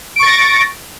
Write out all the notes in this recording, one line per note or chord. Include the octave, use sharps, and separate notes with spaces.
C#6 A6 A#6 D7